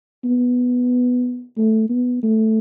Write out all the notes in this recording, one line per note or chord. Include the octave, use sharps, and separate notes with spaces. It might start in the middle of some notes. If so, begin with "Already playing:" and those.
B3
A3
B3
A3